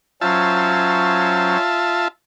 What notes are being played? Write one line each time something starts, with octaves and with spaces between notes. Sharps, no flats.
F#3 C#4 F4 C5 E5 A5